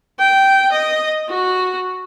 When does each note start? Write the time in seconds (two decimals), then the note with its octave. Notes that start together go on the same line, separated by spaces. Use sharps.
0.20 G5
0.72 D#5
1.29 F#4